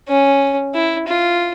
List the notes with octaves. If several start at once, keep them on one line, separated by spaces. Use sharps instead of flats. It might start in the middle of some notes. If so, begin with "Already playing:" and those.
C#4
E4
F4